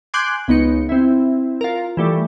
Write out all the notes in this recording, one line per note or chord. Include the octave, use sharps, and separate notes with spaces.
G#5 C6 D6 F#6 G6
C#2 B3 D#4 C#7
C4 E4
F4 A#4
E3 G3 A3